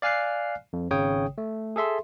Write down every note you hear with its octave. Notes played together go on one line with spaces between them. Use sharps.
D5 F5 G#5 F6 F#6 C7
F2
G#1 C#3 C#5 G5 D#6
A3
G#4 A4 E5 C6